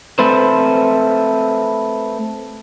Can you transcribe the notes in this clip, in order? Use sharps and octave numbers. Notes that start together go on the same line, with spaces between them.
A3 C4 B4 C5